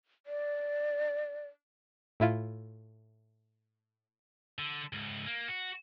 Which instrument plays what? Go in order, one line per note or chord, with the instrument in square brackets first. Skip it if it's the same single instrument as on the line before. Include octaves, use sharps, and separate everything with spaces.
[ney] D5
[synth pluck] A2 E4 F4
[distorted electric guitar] D3
C#2 G#2
A#3
F#4